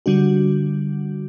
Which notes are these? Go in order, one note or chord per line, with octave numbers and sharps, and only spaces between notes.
D3 G3 D4 F#4